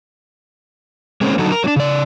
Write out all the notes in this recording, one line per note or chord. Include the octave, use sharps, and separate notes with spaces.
G#3 A#3 C4 C#4
D3 F#3 D#4 F#4 A4
A#4
F#3 D4
C#3 D5